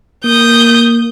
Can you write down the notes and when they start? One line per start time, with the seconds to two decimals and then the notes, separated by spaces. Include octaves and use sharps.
0.24 A#3 D#6 G6